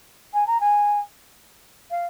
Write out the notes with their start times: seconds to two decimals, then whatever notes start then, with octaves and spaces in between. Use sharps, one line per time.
0.33 G#5
0.47 A#5
0.60 G#5
1.91 F5